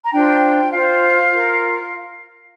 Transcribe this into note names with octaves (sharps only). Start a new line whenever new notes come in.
A#5
D4 F4 C5 G5
F4 C5 F5
F4 A#4